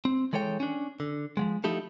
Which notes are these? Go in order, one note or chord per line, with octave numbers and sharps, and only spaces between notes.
C4
E3 G#3 A4 C#5 G5
C#4 D4
D3
F3 F#3 G#3
F3 A3 D#4 E4 G4 A4